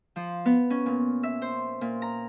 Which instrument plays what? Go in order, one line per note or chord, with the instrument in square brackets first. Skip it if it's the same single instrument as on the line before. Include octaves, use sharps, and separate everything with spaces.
[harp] F3
B3
C#4
A#2
E5
C5
A#2
A#5